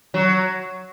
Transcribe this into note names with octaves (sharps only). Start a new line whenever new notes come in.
F#3